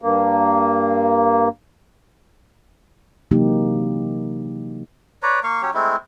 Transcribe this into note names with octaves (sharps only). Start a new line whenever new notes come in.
G2 A#3
C3 E3 F#3 A#3 D#4 G4
B4 C#5 D5 A#5
A#3 F5 C#6
F#3 C#4 G4 C#5
G#3 A3 C4 E4